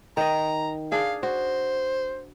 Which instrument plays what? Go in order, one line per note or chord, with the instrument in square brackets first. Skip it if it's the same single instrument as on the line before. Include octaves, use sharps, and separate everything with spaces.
[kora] D#3 D#5 [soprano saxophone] A#5
[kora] D4 G#4 [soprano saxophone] F5
[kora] F#4 [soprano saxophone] C5